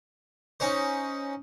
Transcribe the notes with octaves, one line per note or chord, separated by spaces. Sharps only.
C#4 D#4 C5